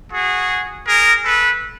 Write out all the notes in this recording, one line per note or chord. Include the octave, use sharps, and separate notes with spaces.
F#4 G#4
G#4 A#4
A4 B4